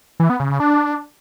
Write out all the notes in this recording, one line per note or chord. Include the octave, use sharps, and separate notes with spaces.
E3
B3
C#3
C#3
D4